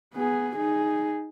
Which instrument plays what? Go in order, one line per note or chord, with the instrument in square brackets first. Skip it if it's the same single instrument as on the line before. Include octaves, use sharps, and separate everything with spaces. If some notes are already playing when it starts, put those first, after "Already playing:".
[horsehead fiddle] B3 G#4
D#4 G#4